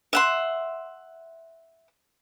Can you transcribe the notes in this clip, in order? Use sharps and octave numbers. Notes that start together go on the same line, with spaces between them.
E5 F#5 C6